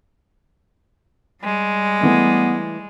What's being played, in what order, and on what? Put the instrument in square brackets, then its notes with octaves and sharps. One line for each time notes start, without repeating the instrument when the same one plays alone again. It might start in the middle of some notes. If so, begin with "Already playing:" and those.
[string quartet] G3 G#3
[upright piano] E3 A3 [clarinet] B3